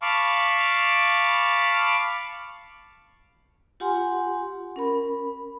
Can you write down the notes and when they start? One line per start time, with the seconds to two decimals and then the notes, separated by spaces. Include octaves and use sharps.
0.02 F5 A5 B5 C#6 D6 F6
3.80 F4 G4 F#5 G#5 C6
4.76 C#4 A#4 B5